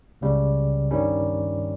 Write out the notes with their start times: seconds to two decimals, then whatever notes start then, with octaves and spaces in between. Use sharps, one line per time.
0.21 C#2 C#3 G3
0.91 G2 D#3 G3 C#4